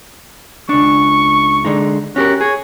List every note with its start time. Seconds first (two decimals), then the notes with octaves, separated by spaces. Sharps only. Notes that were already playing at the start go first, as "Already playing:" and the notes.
0.69 C#2 D4 C#6
1.65 D3 G#3 D#4
2.16 C#4 F#4 G4 A#4
2.41 G#4 C#5